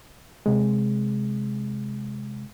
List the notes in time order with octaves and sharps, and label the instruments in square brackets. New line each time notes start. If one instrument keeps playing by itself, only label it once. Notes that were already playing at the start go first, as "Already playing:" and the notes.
[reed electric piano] C3 G#3